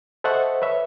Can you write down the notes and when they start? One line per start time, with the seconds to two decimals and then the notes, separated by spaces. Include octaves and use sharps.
0.24 A4 C5 D#5 E5 F#5 C#6
0.62 B4 C#5 E5